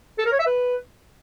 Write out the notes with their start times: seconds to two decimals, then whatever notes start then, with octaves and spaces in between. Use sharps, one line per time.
0.19 A4
0.25 A#4
0.32 C#5
0.39 E5
0.46 B4